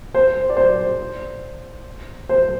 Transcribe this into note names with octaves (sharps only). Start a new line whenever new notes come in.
C5
D5
C5
C5